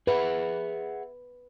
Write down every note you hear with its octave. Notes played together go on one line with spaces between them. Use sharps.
G#4 B4 E5 F#5